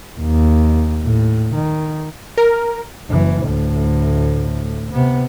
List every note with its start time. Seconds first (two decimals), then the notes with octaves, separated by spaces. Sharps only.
0.19 D#2
1.04 A2
1.55 D#3
2.37 A#4
3.09 F#1 E3
3.45 D2 A2
4.91 C3 B3